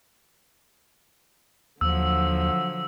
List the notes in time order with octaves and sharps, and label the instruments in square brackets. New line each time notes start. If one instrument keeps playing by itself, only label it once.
[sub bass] D#2 [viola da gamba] D3 F3 F#3 [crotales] E6